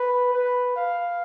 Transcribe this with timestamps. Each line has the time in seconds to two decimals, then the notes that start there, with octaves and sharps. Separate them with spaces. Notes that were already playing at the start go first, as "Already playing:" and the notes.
Already playing: B4
0.34 B4
0.76 F5